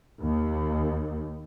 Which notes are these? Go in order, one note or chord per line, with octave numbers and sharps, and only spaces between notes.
D#2